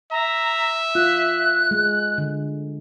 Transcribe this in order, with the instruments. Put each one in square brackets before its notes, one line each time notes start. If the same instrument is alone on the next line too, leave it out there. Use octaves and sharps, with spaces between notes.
[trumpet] E5 [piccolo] A#5
[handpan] F4 [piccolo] F#6
[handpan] G#3
D3